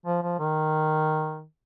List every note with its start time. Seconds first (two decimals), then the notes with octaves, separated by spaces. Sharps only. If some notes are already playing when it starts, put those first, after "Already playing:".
0.06 F3
0.23 F3
0.40 D#3